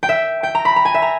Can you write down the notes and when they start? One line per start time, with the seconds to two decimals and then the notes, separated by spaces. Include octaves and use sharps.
0.03 G5
0.09 E5
0.43 G5
0.55 A#5
0.65 B5
0.76 A#5
0.85 G#5
0.94 E5
1.02 A#5